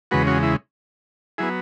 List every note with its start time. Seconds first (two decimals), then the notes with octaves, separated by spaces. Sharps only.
0.11 E2 C#3 G#3 F#4 B4
0.27 C#4 F#4
0.43 E4
1.38 F#3 B3 E4 G#4